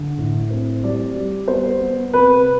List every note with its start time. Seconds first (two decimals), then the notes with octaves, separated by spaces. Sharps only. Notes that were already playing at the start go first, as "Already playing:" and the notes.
Already playing: D3
0.18 A2
0.50 C4
0.84 G3 D5
1.15 G3
1.48 B3 C5
1.80 B3
2.13 C3 B4